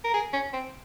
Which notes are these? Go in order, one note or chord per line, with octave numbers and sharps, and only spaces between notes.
A#4
G#4
C#4
C4